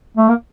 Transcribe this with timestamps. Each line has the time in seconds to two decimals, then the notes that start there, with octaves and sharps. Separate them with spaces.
0.17 A3
0.28 A#3